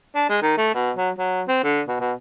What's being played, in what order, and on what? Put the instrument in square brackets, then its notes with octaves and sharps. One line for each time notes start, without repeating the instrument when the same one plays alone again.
[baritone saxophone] D4
G#3
D#3
A3
B2
F#3
F#3
C4
D3
B2
B2